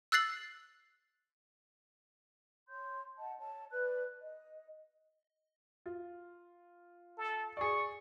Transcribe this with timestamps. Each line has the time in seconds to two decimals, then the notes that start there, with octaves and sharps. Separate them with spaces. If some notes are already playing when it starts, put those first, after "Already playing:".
0.12 E6 F#6 A6 C7 F#7
2.68 C#5 C6 G6
3.18 D#5 F#5 A5
3.39 C#5 A5
3.70 B4 D5 F#6
4.21 D#5
5.86 F4
7.18 A4
7.57 G#4 D5 C#6